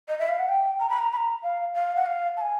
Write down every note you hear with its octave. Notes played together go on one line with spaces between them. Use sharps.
D#5
E5
F5
F#5
G5
A#5
B5
A#5
B5
A#5
F5
F5
F#5
F5
A5
G#5